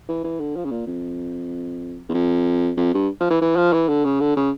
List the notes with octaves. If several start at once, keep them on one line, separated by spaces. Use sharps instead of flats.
E3
E3
D3
F3
C#3
A#2
F2
E2
F2
F2
G2
F3
E3
E3
F3
E3
D3
C#3
D3
C#3